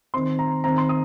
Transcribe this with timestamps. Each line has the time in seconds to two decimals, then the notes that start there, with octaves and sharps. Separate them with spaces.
0.14 D#3 C4 C6
0.39 A#5
0.64 D#3 C4 A#5
0.78 C6
0.89 D#6